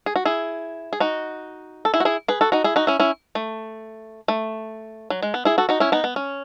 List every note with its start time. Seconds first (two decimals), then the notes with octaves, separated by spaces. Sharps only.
0.06 G#4
0.16 F#4
0.25 E4 G#4
0.93 G#4
1.00 D#4 F#4
1.85 A4
1.94 E4 G#4
2.00 F#4
2.05 E4 G#4
2.28 G#4 B4
2.41 F#4 A4
2.52 D#4 F#4
2.64 E4 G#4
2.76 D#4 F#4
2.87 C#4 E4
3.00 C#4 E4
3.35 A3
4.28 A3
5.10 F#3
5.22 G#3
5.34 B3
5.45 E4 G#4
5.58 F#4 A4
5.69 D#4 F#4
5.80 C#4 E4
5.92 B3 D#4
6.04 B3
6.16 C#4